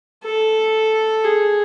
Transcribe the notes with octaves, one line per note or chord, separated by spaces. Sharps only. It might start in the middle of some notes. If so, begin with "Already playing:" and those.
A4
G#4